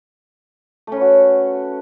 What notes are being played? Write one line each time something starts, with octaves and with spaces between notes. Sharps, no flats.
A3 C#4 F#4 B4